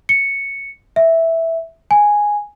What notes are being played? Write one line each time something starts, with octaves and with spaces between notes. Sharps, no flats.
C#7
E5
G#5